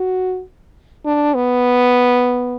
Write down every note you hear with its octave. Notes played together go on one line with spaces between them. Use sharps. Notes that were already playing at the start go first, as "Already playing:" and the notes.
Already playing: F#4
D4
B3